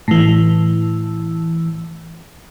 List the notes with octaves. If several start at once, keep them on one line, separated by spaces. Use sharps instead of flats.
A2 E3